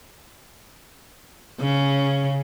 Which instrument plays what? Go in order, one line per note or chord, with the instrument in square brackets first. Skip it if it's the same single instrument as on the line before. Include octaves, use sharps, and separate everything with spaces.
[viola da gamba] C#3